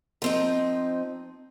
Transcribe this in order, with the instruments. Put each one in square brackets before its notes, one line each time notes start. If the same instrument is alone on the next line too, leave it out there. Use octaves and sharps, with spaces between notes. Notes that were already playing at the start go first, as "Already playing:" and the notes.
[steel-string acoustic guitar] F3 C4 D#4